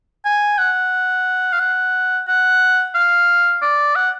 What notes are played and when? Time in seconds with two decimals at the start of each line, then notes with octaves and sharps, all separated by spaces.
0.25 G#5
0.58 F#5
1.52 F5
1.59 F#5
2.27 F#5
2.94 F5
3.62 D5
3.95 F#5